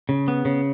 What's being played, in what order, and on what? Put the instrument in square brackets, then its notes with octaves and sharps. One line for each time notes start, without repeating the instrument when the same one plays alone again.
[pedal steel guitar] C#3
B3
C#3